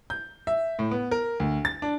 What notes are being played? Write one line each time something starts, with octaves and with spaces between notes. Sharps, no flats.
G6
E5
A2
B3
A#4
D2
A6
D4